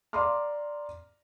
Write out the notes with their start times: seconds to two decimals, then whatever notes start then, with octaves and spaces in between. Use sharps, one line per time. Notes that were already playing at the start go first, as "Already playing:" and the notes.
0.13 D5 F5 A#5 C6 D6 F6